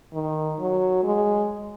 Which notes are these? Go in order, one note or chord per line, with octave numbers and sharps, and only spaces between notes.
D#3
F#3
G#3